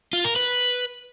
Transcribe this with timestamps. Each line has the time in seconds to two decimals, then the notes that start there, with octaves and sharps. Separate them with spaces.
0.13 F4
0.24 A#4
0.36 B4